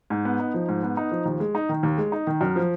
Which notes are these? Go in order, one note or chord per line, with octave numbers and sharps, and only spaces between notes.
G#2
B3
D#4
F3
G#2
B3
D#4
F3
D#2
G#3
D#4
D#3
D#2
G#3
D#4
D#3
F#2
F3